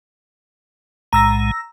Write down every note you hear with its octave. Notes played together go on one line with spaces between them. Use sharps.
B1 A2 G#3 A#5 E6 A#6